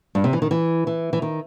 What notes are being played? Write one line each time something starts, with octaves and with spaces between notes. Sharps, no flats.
G2
C3
E3
D#3
E3
E3
E3
D#3